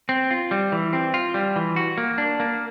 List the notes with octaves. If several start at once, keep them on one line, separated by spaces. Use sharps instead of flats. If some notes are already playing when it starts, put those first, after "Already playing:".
C4
F4
G3
E3
C4
F4
G3
E3
F#4
A#3
D4
A#3